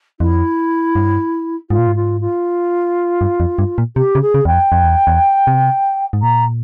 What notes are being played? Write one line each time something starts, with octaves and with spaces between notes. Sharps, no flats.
F2 E4
G2
G#2 F4
A#2
G#2
F4
F4
G2
F2
G2
A#2
C3 G4
C#3
G#4
C#3
E2 G5
F2
F2
E2
E2
C3
G#2
A#2 A#5